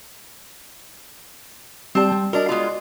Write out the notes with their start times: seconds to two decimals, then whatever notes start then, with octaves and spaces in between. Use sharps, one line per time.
1.95 G3 C4 G4 D5 A5
2.12 G3
2.33 D4 F#4 A#4 D5 D#5
2.49 G#3 B3 F4